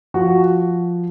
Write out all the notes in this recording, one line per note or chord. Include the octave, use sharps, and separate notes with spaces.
F3 F#4